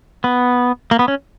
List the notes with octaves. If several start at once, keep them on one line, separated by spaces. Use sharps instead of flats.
B3
A#3
B3
C#4